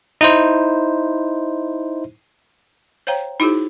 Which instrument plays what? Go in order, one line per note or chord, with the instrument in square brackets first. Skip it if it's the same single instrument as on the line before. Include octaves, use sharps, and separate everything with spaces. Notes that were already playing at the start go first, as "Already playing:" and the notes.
[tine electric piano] D#4 E4 C5
[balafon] C5 C#5 F5 G5 A#5
D#4 E4 F#4 G#4 C5